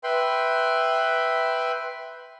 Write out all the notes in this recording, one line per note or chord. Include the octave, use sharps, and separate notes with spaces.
B4 E5 G5 B5 C6